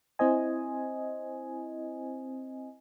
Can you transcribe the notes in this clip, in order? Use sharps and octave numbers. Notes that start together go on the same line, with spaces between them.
C4 E4 C5 D#5 G#5